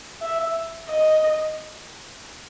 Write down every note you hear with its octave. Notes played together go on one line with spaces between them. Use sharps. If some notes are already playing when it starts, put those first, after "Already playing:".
E5
D#5